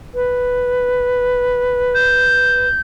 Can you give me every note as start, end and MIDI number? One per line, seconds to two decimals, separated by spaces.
0.15 2.68 71
1.95 2.81 91